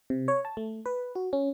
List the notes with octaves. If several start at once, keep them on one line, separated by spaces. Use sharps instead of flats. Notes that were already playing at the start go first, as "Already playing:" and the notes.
C3
C#5
A5
A3
B4
F#4
C#4